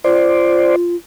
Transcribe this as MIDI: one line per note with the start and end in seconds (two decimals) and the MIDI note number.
0.04 0.96 65
0.04 0.76 72
0.04 0.76 74